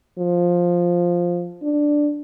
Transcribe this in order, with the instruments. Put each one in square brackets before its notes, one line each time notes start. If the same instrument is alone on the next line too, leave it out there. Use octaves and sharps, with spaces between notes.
[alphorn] F3
D4